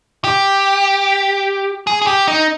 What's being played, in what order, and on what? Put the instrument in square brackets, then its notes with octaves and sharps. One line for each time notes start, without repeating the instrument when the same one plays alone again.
[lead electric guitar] G4
G#4
G#4
G4
D#4